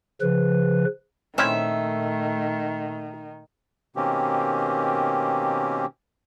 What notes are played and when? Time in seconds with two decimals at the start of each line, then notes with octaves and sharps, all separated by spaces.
0.21 C#3 F3 B4
1.38 A#2 D#3 A3 C4 C#4 E4 E5
3.96 B2 D#3 A#3 C4 C#4 G4